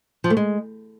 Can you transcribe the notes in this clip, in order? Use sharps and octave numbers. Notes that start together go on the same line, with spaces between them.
F3
A3
G#3